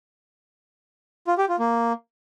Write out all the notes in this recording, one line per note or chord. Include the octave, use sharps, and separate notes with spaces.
F4
G4
F4
A#3